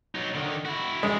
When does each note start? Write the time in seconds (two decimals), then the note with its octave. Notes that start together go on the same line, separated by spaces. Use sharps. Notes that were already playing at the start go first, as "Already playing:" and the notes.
0.15 F#3 D#4
0.34 D3 D#3
0.65 E4 F#4
1.03 G#3